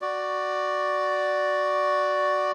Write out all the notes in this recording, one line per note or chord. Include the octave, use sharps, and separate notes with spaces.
F#4 D5